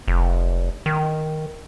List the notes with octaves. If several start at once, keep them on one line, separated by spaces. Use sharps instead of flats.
F1
D#3